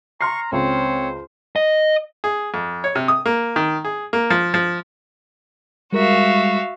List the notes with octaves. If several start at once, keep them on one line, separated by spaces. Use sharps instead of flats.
A#5 C6 C#6 F6 C7
C#2 C4 C5 C#5
D#5
G#4
F2
C#5
C3
D#6
A#3
D#3
G#4
A#3
F3
F3
G3 G#3 F#4 A#4 E5 F5